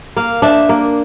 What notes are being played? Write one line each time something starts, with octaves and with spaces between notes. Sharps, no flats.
A#3 F5
D4 E5
A#3